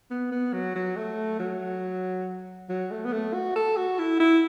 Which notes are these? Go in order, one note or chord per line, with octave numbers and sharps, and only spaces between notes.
B3
B3
F#3
F#3
A3
F#3
F#3
A3
B3
A3
F#4
A4
F#4
E4
E4